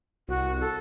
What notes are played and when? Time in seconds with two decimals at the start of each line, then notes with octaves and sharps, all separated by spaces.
0.29 C2 F#4
0.60 A4